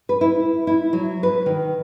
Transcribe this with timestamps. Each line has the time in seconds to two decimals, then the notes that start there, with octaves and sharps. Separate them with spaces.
0.09 B4
0.21 E4
0.67 E4
0.93 F#3
1.23 B4
1.46 D#3